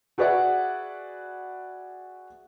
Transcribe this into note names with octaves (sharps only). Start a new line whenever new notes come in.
F#4 G#4 B4 D5 E5 F#5